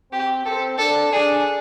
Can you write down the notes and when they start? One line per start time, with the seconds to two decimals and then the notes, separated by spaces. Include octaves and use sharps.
0.12 C4 G4
0.46 C4 A4
0.78 D4 A4
1.12 D4 G#4